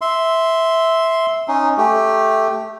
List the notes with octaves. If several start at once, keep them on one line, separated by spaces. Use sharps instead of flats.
E5 C6
C#4 D#4
A3 G4